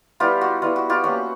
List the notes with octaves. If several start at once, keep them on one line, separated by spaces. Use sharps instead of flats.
G3 B3 E4 F4 G4
F#4
G3 B3 E4 F4
F#4
F4 G4
F#3 A#3 C#4 F#4